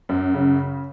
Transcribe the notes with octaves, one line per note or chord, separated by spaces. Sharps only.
F#2
C#3